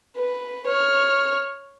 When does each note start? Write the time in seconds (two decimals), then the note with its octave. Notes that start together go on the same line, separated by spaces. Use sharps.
0.16 B4
0.67 C#5 F6